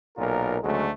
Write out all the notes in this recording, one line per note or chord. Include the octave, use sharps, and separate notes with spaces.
B1 A#2 F4 A#4
D2 C#3 F#3 G#3 A3